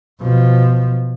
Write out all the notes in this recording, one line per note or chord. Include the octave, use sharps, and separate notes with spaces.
B2 F3